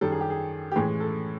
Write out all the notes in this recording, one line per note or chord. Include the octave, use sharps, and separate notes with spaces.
F#2 D#3 G3 A4
G#4
G4
G#4
G4
A2 E3 G#3 G#4
A4